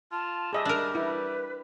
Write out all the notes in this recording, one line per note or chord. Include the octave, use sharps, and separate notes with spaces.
F4 A5
G3 G#4 D#5 E5
D4 A#4
E4 B4